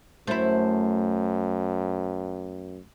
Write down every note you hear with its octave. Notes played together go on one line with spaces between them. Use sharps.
F#2 A3 E4 C5